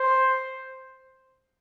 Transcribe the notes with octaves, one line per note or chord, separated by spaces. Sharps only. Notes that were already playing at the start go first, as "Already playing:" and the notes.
Already playing: C5